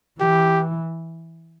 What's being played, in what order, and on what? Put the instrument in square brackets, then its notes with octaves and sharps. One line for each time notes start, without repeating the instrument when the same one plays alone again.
[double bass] E3 [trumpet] G4